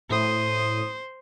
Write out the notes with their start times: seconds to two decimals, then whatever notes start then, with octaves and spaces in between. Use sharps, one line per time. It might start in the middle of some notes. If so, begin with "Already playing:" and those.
0.10 A2 C5 D#6